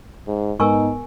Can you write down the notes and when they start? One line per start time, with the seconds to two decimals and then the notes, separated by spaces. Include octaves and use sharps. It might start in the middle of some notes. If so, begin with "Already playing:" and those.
0.27 G#2
0.60 G#2 B3 D#4 A#4 G#5 C#6